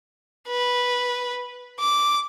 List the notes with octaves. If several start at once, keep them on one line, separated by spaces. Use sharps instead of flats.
B4
D6